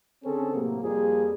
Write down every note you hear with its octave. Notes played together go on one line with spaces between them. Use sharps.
D3 C4 C#4 G#4 A4
A2 C3 F#3 A#3
F2 F3 G3 A#3 G#4